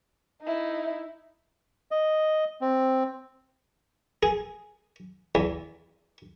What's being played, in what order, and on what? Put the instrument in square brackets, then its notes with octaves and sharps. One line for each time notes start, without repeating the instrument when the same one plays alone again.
[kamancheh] D#4 E4
[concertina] D#5
C4
[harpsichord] G#4
E2